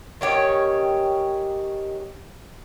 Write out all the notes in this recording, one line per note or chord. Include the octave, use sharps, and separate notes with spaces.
D#3 C#4 G4 C#5